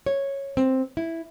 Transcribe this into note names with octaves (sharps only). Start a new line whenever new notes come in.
C#5
C4
E4